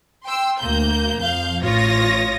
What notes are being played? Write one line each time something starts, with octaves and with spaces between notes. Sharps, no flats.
G5 C6 E6
D2 A#3 G6
F2 F5 G6
A1 F4 C#5 D#6 A#6